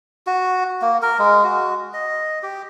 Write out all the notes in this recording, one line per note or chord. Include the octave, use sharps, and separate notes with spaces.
F#4
A#3
A#4
G#3
F#4
D#5
G4